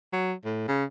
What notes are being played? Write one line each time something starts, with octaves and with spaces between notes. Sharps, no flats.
F#3
A2
C#3